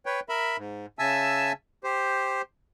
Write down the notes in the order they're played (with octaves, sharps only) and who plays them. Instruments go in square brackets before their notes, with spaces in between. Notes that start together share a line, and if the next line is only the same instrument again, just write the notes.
[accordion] B4 C#5 G5
A#4 E5 B5
G#2
C#3 E5 G#5 A5 E6
G4 C5